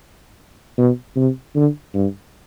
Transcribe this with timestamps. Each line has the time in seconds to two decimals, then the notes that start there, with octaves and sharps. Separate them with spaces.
0.78 B2
1.16 C3
1.55 D3
1.94 G2